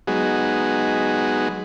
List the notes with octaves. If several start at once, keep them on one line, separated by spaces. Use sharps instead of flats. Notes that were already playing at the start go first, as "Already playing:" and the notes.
F#3 G#3 B3 D#4 F#4 G#4